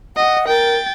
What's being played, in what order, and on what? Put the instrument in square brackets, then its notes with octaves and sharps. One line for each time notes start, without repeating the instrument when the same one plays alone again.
[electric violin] D#5 [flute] F#5
[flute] A#4 [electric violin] G5 A6